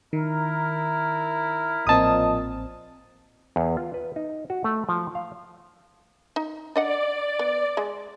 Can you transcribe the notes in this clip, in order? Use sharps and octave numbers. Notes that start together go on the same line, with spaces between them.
D#3 E4 A#4
A1 A#2 F3 C4 D#5 A5 D#6
E2
F4
B4
D#4
F#4
A3
F3
F5
D#4
D4 D5 D#5 F#5
B3
G#3